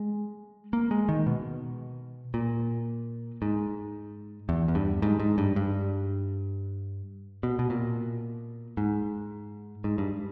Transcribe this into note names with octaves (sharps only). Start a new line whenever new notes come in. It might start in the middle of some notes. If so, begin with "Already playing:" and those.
Already playing: G#3
A#3
G#3
D#3
B2
A#2
G#2
E2
E2
G2
G#2
G#2
G2
G2
B2
B2
A#2
G#2
G#2
G2